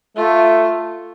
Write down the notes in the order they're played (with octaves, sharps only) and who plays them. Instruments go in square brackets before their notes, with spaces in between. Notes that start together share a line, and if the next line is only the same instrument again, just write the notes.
[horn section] A3 [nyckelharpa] F4